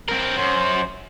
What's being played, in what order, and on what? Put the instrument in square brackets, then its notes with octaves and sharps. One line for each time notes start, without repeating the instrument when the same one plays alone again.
[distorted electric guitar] C4 A#4
[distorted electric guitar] F#2 [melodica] C5